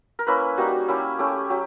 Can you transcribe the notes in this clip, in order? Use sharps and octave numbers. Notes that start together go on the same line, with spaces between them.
A#4
A#3 C#4 E4 B4
G3 A#3 D#4 F#4
A#3 C#4 E4 G4
A3 C#4 E4 G4
F#3 G4